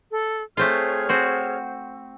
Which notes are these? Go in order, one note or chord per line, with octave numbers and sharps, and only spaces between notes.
A4
A3 C4 F4 G#4 C#5 F6
C4 F#4